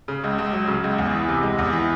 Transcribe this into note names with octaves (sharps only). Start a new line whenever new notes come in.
C#3
C#2
C#2
F#3
C#3
C#2
E2
E3
C3
G#3
E2
E3